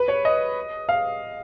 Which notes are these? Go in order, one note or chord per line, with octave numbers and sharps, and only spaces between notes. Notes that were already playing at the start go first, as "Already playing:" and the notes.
Already playing: B4
C#5
D#5
F5